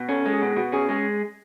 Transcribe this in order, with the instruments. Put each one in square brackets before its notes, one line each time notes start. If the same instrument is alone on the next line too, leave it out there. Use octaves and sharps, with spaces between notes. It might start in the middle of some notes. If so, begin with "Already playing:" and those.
Already playing: [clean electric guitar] B2
[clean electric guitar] C#4 [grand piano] A4
[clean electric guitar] G#3
[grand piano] G#4
[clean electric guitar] B2
[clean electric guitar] B2 [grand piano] F#4
[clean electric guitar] C#4 [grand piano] G#4
[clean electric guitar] G#3 [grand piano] G#4